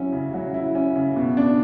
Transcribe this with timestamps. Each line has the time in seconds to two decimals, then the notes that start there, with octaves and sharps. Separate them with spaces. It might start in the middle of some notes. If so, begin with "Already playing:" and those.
Already playing: F#3 C#4 E4
0.12 C#3
0.34 F#3
0.54 E4
0.75 C#4
0.95 C#3
1.16 B2
1.37 D4